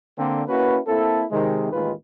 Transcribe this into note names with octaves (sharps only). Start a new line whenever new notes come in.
D3 A#3 C4
A#3 C#4 E4 F#4 B4
A#3 C4 E4 A4
C3 D#3 G#3
A1 D#2 D#3 G#3 F4 B4